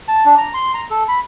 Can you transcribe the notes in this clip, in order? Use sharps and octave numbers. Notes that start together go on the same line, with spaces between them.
A5
D4
A#5
C6
A#5
A4
B5